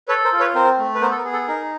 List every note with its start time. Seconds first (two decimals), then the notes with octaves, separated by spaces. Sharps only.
0.08 A4 B4 C#5
0.24 A#4 C5
0.33 F4
0.40 B4 C#5
0.55 C4 A#4 C5
0.78 A3
0.95 B4
1.01 B3 A#4 C5
1.11 A4
1.18 A#4
1.24 G#4
1.33 A4
1.48 D#4 A#4